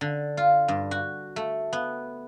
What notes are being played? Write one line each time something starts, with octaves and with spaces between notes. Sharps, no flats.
D3
F4
G2
F#4
A3
B3